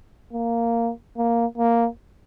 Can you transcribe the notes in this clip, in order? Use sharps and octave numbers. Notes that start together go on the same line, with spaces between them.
A#3
A#3
A#3